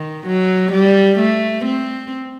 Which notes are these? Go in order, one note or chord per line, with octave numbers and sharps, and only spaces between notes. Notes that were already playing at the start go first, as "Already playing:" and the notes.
Already playing: D#3
F#3
G3
A3
C4